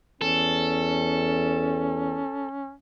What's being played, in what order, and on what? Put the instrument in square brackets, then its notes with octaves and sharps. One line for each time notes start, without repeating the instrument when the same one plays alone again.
[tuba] E2 [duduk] C#4 [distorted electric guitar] A4